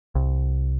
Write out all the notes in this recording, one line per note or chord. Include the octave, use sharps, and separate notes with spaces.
C2